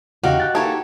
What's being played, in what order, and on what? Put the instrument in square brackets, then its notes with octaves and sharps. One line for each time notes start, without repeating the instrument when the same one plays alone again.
[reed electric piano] E2 C#3 [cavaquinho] D#4 G4 F5 [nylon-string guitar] F#4
[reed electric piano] G5 F#6 A6
[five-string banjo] E3 A#3 A4 [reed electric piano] D#4 G#6 [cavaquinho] G4 C#5